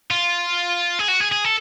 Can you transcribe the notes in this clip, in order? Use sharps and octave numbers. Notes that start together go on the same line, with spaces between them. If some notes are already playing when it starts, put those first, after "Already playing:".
F4
G#4
F#4
G#4
G#4
A4